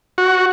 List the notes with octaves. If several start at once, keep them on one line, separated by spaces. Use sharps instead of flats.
F#4